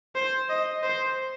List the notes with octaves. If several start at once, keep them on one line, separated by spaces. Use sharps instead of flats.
C5
D#5
C5